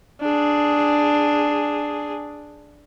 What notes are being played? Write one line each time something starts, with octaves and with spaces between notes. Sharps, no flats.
D4 G#4